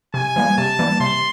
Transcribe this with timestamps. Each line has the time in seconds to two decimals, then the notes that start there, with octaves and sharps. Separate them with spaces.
0.14 C3 G#5
0.36 E3 G3 A#3
0.58 C3 A5
0.79 E3 G3 A#3
1.00 C3 C6